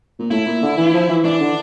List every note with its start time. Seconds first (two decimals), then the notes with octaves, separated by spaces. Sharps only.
0.19 A#2
0.31 A2 E4
0.46 A#2
0.62 D3
0.77 E3
0.93 F3
1.09 E3
1.24 E3 D4
1.40 D3